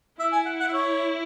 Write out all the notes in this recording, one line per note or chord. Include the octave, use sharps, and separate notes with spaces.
E4 E5
G#5
F#5
F#5
E5
C#5